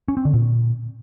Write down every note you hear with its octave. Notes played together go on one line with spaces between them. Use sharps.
C#4
C4
D3
A#2